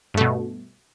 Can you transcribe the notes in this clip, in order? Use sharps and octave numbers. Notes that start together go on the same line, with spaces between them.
G2 B2 A3